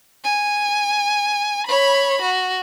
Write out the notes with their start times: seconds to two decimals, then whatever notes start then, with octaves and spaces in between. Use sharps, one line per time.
0.24 G#5
1.67 C#5 B5
2.22 F#4